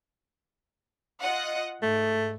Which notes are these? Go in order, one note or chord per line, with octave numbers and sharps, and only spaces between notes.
F4 D#5 F#5
G#2 A3